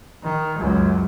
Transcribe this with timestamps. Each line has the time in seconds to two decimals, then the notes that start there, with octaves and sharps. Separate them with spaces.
0.23 D#3
0.58 C#2 F#2